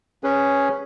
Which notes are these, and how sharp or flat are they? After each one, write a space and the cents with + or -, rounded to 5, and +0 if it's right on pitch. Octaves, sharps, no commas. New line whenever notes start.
C#4 +0 G#4 +0 B4 +0